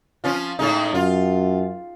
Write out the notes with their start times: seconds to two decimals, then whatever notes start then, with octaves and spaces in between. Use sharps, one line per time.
0.24 F3 C#4 F4
0.59 A2 G#3 D#4
0.94 F#2 F4